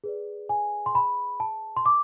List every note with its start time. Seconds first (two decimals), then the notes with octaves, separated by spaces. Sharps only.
0.04 G#4 B4 D5
0.49 G#5
0.86 C6
0.95 B5
1.40 A5
1.77 C6
1.86 D6